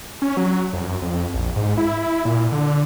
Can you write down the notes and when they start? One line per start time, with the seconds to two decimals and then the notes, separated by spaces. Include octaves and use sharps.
0.22 C#4
0.37 F#3
0.73 F2
0.87 F#2
1.02 F2
1.34 A#1
1.56 G#2
1.78 E4
2.25 A#2
2.52 D3